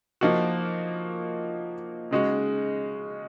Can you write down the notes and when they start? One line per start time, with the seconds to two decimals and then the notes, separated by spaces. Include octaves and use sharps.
0.21 F3 A#3 D#4 F#4
2.11 C#3 G#3 D#4 F#4